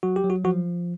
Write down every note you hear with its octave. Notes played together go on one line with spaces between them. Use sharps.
F#3 F#4
G4
F#3
F#4
F3 F#4